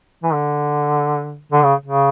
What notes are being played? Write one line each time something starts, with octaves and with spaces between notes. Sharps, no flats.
E3
D3
D3
C#3
C#3